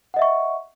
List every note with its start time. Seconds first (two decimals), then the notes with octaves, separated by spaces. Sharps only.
0.14 F#5
0.17 D#5
0.19 E5
0.22 C#6